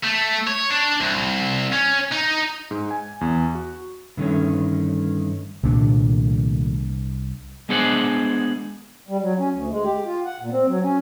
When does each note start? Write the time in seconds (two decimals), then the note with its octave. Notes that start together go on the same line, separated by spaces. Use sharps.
0.04 A3
0.47 C#5
0.70 D4
1.01 C2
1.72 C#4
2.12 D#4
2.71 G#2
2.91 G#5
3.21 E2
3.55 F#4
4.17 G2 D3 D#3 A3 C#4
5.63 C2 A#2 D#3 A3 D4
7.69 G#3 B3 D4 G#4 C5 F#5
9.09 G3
9.22 F#3
9.39 C#4
9.54 D2
9.71 G#3
9.84 G4
10.06 F4
10.25 F#5
10.40 A#2
10.52 C4
10.68 F#3
10.84 C#4